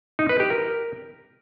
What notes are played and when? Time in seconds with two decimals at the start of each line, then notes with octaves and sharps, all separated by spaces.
0.19 D#4
0.29 B4
0.40 G4
0.50 A#4